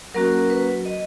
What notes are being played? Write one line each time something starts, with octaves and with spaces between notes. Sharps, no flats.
F#3 A#3 C#4 F#4 A#4
A#4
B4
D#5